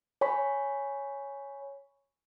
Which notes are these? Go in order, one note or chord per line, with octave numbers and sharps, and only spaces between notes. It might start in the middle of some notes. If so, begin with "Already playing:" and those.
C#5 G#5 B5 C#6 B6